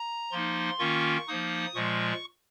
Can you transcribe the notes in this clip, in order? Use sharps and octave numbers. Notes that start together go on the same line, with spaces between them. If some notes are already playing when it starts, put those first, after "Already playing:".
Already playing: A#5
F3 A#3 D#4 C6
D#3 A#3 C#4 F4 C#6
F3 A#3 D#4 D#6
A#2 F3 G#3 C#6